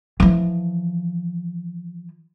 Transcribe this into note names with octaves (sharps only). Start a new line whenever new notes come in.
E3 F3